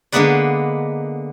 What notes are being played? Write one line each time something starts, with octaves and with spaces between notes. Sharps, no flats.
D3 G#3 A#3 B3 B4 D5